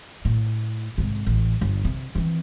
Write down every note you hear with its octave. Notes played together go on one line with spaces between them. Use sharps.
A2
G#2 C3
A1
G1
C3
E3 C4